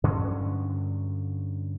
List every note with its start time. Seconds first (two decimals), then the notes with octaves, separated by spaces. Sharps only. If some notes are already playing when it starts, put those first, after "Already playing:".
0.04 G2 D3 F#3 C#4